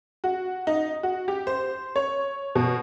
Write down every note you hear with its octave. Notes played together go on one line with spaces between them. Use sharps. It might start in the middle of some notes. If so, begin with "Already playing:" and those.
F#4
D#4
F#4
G4
C5
C#5
B2